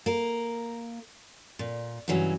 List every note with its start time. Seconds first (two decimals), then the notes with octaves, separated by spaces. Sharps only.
0.06 A#3 A#4
1.59 A#2
2.08 G2 C#3 E3 F#3 C#4